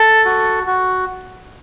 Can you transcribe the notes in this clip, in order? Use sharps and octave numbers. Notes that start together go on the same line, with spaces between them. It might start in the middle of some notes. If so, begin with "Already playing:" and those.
Already playing: A4
F#4
F#4